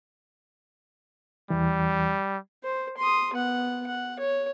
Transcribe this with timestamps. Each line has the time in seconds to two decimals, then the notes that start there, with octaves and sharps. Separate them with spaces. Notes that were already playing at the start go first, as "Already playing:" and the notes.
1.50 E2 E3 G3
2.64 C5
2.97 C6 D#6
3.34 B3 F#5
3.87 F#5
4.20 C#5